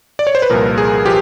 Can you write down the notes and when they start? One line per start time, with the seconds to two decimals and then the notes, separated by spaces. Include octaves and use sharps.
0.19 D5
0.27 C#5
0.35 C5
0.42 B4
0.50 C2 A#2 F3 A#4
0.78 G#4
1.06 F3 G4